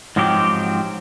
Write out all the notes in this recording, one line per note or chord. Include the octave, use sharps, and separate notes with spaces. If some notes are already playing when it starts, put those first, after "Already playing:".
G#2 F3 F#3 C4 G4